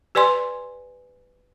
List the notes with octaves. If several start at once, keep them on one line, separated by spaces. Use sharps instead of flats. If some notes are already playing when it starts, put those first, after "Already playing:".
G4 B4 D5 G#5 C6